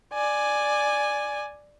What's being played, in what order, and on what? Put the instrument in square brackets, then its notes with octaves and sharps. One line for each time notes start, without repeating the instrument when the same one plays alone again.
[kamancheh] D5 G#5